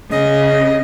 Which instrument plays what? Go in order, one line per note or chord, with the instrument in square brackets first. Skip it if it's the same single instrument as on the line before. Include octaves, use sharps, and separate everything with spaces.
[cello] C#3 [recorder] D#5